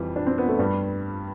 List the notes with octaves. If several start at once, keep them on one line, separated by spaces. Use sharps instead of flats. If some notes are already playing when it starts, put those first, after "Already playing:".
Already playing: F2 E3 F3 G3
D4
C4
B3
A3
G2 G3